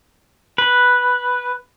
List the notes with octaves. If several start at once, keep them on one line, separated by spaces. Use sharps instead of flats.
B4